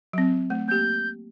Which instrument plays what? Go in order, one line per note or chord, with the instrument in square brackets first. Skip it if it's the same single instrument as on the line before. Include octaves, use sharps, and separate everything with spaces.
[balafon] F#3 C4
A3
[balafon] A#3 G4 [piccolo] G6